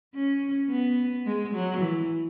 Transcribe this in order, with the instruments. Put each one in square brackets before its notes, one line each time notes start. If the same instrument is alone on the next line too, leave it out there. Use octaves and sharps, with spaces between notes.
[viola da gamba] C#4
B3
G#3
F#3
E3